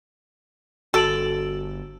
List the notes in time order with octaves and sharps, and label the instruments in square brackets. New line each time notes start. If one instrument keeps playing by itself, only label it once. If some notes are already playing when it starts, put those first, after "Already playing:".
[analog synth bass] G1 [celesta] F#4 D7 F#7 [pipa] A4